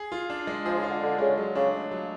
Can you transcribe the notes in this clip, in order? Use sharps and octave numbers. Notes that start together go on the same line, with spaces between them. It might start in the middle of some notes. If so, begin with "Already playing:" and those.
Already playing: G#4
F4
D4
G#3
F3 G#4
C#3
F4
D3
D3 D4
C#3 G#3
F#3
C#3 D4
A3
F#3